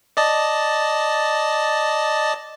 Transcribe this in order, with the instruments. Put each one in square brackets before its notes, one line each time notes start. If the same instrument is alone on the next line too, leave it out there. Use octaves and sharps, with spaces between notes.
[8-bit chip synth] D5 D#5 A5